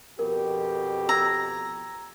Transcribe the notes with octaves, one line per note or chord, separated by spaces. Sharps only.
F2 B2 G4 A#4
A#5 E6 G#6